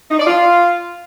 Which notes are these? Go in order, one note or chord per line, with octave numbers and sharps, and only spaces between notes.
D#4
D5
F4